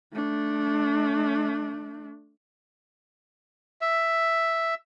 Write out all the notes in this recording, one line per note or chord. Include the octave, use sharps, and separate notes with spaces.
A3 D4
E5